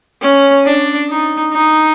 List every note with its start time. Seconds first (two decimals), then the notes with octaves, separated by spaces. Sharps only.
0.22 C#4
0.65 D4
1.09 D#4
1.52 D#4